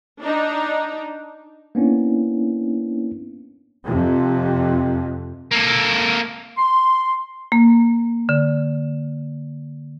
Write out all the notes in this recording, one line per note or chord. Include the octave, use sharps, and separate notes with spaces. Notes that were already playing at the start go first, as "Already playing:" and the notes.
D4 D#4
A#3 B3 C#4 D4 E4
F2 C3
A#3 A4
C6
A#3
D3